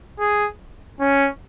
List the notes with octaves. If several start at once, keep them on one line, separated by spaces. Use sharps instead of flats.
G#4
C#4